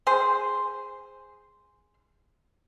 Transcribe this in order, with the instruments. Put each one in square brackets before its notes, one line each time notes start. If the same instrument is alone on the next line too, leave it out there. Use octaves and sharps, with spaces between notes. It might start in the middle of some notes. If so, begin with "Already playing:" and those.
[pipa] G#4 C5